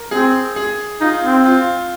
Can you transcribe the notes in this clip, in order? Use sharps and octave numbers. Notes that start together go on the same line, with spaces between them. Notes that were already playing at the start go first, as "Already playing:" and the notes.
Already playing: A#4
C4 G#4
G#4
D#4 F4
C4
F4